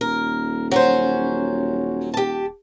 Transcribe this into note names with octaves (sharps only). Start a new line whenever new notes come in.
D#1 A#4
F#3 C#4 C5
G4 A5